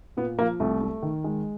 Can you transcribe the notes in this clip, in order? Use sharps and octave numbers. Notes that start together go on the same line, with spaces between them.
A#2 B3
F3 A#3
C2 A3
A3
D#3
G#3